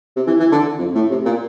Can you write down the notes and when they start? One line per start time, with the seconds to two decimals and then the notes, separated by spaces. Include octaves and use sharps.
0.16 C3
0.27 E3
0.40 E3
0.52 D3
0.79 F2
0.94 A2
1.11 C3
1.25 A#2